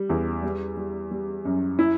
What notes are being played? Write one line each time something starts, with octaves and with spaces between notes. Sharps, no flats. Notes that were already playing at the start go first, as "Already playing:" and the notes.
Already playing: G3
E2
G3
G3
G3
F#2
E4